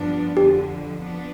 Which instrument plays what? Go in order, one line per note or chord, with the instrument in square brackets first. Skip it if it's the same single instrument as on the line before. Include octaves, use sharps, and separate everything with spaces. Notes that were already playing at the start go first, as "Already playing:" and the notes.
Already playing: [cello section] G2 F3 B3 D4
[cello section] F2 D3 F3 [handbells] G4
[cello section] F3 B3 D4